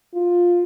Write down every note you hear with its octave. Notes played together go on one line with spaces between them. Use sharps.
F4